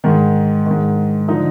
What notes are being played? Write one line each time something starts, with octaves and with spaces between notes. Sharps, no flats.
G#2 D#3
G#2 D#3
D3 F3 D#4